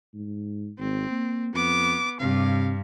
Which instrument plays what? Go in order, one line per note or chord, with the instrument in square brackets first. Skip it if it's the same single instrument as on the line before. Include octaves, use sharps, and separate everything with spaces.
[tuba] G#2
[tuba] G#1 [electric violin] C4
[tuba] A#3
[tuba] F2 [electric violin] B3 D6
[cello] G2 [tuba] C3 [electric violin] F5